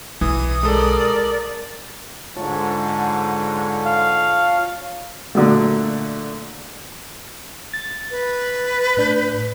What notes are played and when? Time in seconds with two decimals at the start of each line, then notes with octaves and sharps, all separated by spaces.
0.21 B1 E3 D#6
0.63 G#3 A4 A#4 D5
2.36 G#2 D3 F4 C#5 A5
3.85 F5
5.35 A#2 D3 F#3 A3
7.73 A6
8.11 B4
8.97 A2 D4 G6